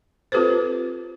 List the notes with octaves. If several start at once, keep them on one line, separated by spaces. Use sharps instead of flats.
C4 F4 G4 A4 B4 C5